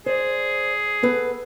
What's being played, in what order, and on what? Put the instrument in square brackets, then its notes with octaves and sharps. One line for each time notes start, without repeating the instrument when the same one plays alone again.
[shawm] G#4 [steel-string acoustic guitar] C5 D5
[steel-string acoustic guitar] B3 A4 B4